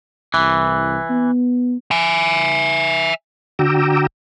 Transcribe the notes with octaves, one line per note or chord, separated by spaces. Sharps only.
C2 E3
B3
E5 G#5
D3 F#4 G5 A#5 D6 E6